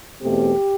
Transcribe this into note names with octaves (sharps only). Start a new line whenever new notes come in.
E2 B2 A3 C4 G4